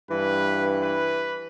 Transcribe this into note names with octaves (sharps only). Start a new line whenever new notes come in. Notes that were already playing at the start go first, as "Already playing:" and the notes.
G2 E3 B4
B4